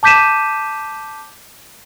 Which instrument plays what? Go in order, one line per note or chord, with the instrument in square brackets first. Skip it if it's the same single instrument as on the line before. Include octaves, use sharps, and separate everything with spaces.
[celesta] A5 D6 G6 B6 D#7 E7